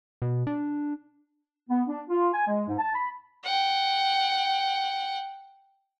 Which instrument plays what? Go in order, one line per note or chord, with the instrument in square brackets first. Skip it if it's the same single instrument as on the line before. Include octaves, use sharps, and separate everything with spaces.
[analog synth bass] B2
D4
[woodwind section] B3
D4
F4
G#5
G#3
G#2
A5
B5
[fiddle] F#5 G5